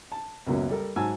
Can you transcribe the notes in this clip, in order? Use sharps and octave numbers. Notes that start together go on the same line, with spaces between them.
A5
C#2 F#2 B2 F#3 A#3 C#4
G3 A4 A#4
G#2 F#3 G#5 A5 E6